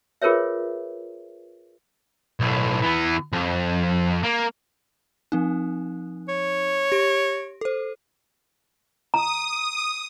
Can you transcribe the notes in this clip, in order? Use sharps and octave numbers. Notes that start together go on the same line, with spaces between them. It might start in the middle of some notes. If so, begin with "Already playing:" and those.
F4 G#4 A#4 B4 C#5 E5
B1 A2
E3 B3
F2
A#3
F3 C4 D#4
C#5
G4 D7
A4 C5
A#5 D#6